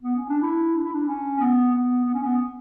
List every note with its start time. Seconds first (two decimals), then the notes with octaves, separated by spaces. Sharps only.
0.03 B3
0.16 C#4
0.29 D4
0.42 E4
0.75 D4
0.84 E4
0.93 D4
1.07 C#4
1.39 B3
1.73 B3
2.05 B3
2.14 C#4
2.23 B3